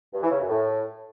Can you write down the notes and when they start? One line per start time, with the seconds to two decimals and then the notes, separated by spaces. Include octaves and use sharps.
0.13 G2
0.22 E3
0.31 C#3
0.40 F#2
0.49 A2